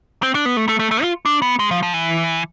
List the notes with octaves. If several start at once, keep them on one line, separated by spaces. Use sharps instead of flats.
C4
D4
B3
A3
A3
A3
A3
F4
D4
B3
G#3
F3
F3
E3